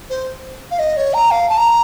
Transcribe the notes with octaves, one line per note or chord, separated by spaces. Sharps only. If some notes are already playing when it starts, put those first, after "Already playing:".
C5
F5
D#5
C#5
A#5
F5
A5
A#5